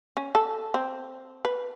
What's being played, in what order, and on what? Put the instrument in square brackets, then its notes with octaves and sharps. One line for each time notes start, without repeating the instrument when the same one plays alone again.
[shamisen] C#4
A4
C4
B4